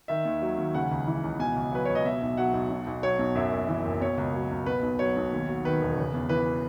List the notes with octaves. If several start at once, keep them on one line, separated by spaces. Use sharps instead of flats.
D#3 E5
D#2
F#3
D#2
C#3 F#5
C#2
E3
C#2
B2 G#5
C#2
F#3 B4
C#2 C#5
D#5
B2 E5
B1
F#3 F#5
B1
B2
B1
F#3 C#5
B1
F#2 E5
F#1
E3
F#1
B2 C#5
C#2
F#3
C#2
B2 B4
B1
F#3 C#5
B1
D#2
F#3
D#3 B4
E1
C#3
E2
E3 B4